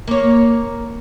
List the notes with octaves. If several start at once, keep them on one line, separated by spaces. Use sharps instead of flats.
A#3 C#5